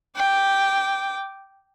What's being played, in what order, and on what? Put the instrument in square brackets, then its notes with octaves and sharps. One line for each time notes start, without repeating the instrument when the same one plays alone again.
[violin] G5 D6